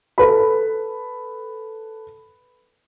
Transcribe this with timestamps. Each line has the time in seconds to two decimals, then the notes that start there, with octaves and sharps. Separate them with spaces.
0.18 A4 B4 B5